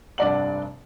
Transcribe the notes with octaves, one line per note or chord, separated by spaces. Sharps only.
F1 G2 D4 D5 F#5 F#7